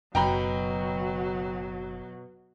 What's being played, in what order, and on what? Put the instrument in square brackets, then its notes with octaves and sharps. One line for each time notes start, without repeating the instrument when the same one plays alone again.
[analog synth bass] F#1 [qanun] B2 [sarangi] F#3 [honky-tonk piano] G5 A#5 B5